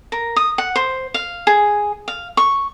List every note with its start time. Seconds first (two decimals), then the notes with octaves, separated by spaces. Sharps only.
0.12 A#4
0.36 D#6
0.58 F#5
0.76 C5
1.14 F5
1.47 G#4
2.08 F5
2.37 C#6